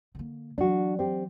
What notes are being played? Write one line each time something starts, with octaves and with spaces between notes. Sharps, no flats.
D3 A#3
E3 F#3 D4 F#4
C4 G4